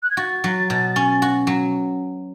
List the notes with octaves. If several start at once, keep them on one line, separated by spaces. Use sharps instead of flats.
F#6
G#6
F#4 A6
F#3
B2
C#4
F#4
F#3